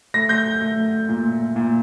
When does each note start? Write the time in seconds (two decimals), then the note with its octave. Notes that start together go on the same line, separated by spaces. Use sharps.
0.14 A3 A#6
0.29 G6 A#6
0.62 A3
1.09 A#2
1.56 A#2